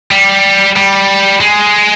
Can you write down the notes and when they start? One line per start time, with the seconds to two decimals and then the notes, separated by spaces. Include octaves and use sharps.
0.11 G3
0.76 G3
1.41 G#3